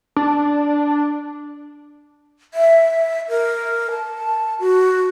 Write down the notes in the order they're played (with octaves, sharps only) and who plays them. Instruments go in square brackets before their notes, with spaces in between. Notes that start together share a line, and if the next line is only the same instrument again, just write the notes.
[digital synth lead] D4
[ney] E5
A#4
A5
F#4